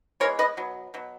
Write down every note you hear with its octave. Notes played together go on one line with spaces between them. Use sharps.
E3 G#3 B3 A#4 C#5
B4 D#5
B2 F#3
B2 F#3